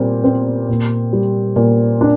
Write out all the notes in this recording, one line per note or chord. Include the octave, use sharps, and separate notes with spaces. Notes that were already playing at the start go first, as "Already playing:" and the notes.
Already playing: A#2 G3 C4
C4
A#2
G3
A#2
D4